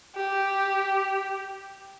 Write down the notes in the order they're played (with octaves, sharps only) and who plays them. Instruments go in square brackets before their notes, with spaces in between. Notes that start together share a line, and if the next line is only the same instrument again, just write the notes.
[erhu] G4